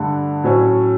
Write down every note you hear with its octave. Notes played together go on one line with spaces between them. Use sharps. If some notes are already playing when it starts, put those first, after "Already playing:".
Already playing: G2 D3 A3
A2 F#3 C#4